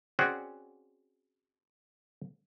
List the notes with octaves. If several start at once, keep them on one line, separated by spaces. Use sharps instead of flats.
C4 C#4 F#4 G#4 D5 F#5